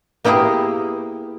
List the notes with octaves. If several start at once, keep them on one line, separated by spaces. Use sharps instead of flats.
A#3 B3 E4 G4 G#4